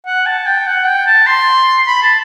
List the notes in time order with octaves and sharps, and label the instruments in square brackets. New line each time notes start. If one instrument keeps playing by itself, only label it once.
[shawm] F#5
A5
G5
F#5
G5
A5
C6
B5
A5